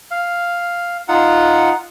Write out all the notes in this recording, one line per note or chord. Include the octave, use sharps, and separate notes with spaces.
F5
D#4 F4 F#5